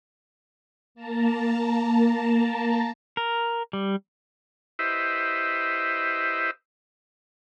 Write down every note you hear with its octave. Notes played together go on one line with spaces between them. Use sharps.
A#3 A5 A#5
A#4
G3
E4 G4 B4 C5 D#5 E5